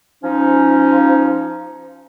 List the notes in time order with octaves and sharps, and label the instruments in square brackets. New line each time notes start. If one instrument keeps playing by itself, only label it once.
[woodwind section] F3 C#4 D#4